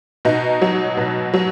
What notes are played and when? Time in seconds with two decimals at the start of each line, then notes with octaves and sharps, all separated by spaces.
0.25 B2 D#4
0.62 F#3
0.97 B2
1.34 F#3